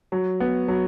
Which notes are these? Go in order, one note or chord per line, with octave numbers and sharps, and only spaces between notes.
F#3
B3
F#3